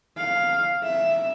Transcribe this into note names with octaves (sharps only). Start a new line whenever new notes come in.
F5
E5